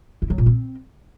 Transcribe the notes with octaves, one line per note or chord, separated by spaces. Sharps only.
E4
F#3
A#2
C4